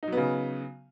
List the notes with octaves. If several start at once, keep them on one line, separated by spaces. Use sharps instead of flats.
C#3 F#3 B3 D#4